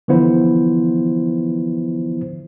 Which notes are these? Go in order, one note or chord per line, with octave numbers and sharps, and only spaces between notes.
D3 E3 F3 B3 E4 C5